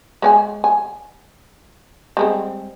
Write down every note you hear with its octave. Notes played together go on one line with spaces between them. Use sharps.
G#3 C#5 G#5
G#5
G3 G#3 C4